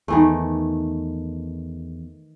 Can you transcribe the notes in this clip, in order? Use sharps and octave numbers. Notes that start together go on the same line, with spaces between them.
E2 D#3 E3 A3